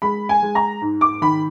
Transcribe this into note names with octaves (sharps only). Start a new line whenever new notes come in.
G#3 B5
G#5
G#3
A#5
G#2
D6
D#3 B5